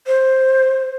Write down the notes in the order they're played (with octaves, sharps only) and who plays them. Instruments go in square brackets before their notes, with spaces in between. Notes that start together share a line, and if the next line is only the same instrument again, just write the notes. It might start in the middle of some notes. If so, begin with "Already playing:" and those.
[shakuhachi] C5